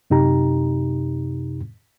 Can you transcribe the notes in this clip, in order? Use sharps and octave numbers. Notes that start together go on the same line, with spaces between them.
F#2 C3 D#4 G4 A#5